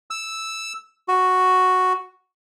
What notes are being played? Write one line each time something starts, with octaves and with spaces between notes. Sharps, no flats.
E6
F#4